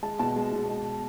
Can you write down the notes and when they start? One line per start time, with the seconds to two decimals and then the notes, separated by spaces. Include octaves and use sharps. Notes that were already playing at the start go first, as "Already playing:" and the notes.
0.03 G#3 A5
0.19 B2 A5
0.36 G#3
0.52 B2
0.68 G#3